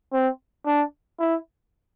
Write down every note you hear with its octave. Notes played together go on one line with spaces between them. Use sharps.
C4
D4
E4